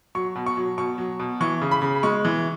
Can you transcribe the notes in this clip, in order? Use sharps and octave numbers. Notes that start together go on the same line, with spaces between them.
F#3 C#6
B2
C#6
F#3
B2 C#6
F#3
B2
E3 C#6
C#3
B5
C#3
G#3 C#6
E3